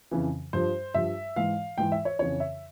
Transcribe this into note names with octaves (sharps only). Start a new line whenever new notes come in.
F2 C#3 E3
G2 F3 C5
G2 F3 E5
G#2 E3 F5
G#2 E3 G5
E5
C#5
F2 C#3 E3 C#5
E5